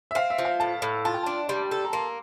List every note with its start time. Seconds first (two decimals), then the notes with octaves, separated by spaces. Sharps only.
0.11 E5
0.15 C4 F5
0.30 E5
0.38 F3
0.45 F5
0.60 A2 A5
0.82 A2
1.05 F4 A5
1.14 G5
1.23 D4 A5
1.49 G3 C6
1.71 A4
1.84 A#5
1.93 A#3 C6